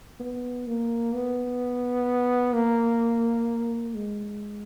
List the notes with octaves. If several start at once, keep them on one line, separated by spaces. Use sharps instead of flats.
B3
A#3
B3
A#3
G#3